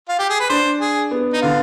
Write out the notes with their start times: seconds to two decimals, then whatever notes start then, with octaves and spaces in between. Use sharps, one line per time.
0.09 F4
0.19 G4
0.30 G#4
0.40 B4
0.50 D4 C5
0.81 G#4
1.11 B3
1.34 D#4
1.42 D3 F4